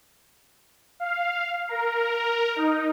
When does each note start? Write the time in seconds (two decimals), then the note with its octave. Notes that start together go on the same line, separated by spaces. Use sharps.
1.00 F5
1.69 A#4
2.56 D#4